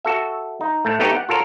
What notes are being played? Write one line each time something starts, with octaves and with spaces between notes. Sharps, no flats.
F#4 A4 E5
D#4
A2 A3
A3 B3 D#4 G4 A4 C#5
F#5
F4 A4 A#4 C#5